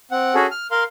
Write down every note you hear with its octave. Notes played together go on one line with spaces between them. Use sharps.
C4 F#5
C#4 F#4 G#4 A4
F6
A#4 F5 C6